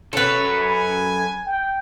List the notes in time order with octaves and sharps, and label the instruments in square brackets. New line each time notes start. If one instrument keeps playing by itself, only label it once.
[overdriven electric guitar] F#2 C#5 [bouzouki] A4 B4
[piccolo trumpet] G#5 [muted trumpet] B5
[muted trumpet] G5